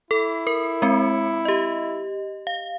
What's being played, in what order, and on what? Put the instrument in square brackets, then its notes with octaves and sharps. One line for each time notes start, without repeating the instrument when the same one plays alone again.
[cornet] E4 [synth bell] A4
[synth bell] A#4
G#3 C4 C#7
G4 D#5
F5